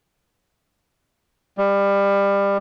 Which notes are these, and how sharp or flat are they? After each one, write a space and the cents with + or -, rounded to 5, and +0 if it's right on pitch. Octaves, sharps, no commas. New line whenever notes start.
G3 +25